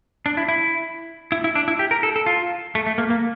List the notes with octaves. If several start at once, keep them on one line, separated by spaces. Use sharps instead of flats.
D4
E4
E4
E4
E4
D4
E4
G4
A#4
A4
A4
F4
A3
A3
A#3
A#3